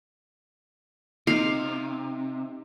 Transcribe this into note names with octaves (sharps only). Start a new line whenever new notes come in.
C3 D#4 F5